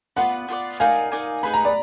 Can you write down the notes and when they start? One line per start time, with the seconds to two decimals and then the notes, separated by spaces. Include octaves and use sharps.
0.16 B3 F4 B4 D5 F#5
0.48 B3 F4 B4 D5
0.80 D#4 A#4 D5 F5 G#5
1.12 D#4 A#4 D5 G#5
1.43 D#4 G#4 B4 B5
1.54 A#5
1.65 D5